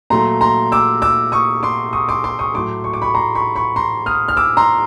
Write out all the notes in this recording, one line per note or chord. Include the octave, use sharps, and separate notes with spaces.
A#2 F#3 A3 A#5 C6
A#5 C6
D6 E6
D6 E6
C#6 D#6
C6 D6
C#6 D#6
C6 D6
C6 D6
C#6 D#6
A2 F#3 A3 C6 D6
C#6
D6
B5 C#6
A#5 C6
B5 C#6
B5 C#6
A#5 C6
D#6 F6
F6
D6 E6
A#5 C6